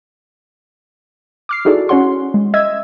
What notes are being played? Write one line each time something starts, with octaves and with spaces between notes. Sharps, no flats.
D6 F6 C7
D#4 E4 F#4 G#4 A4 D5
C#4 F#4 C#5 F#5 C6
G#3
D#5 E5 E6 G#6